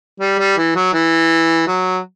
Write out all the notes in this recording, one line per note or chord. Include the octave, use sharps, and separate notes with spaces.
G3
G3
E3
F#3
E3
F#3